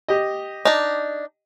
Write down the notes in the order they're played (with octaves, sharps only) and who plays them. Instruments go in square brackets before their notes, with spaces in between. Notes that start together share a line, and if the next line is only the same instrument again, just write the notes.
[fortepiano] G4 D#5
[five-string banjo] D4 D#4